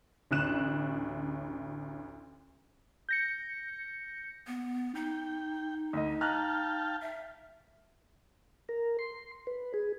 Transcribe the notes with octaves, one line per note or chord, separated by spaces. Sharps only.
A1 D2 C#4 F#6 E7
G6 A#6 C#7
B3
D#4 G5
D2 D#5
F5 G5 A5 A#5 F6 F#6
E5
A#4
C6
B4
G#4